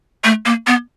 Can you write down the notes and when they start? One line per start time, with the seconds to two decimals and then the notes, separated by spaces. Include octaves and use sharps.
0.24 A3
0.46 A#3
0.67 B3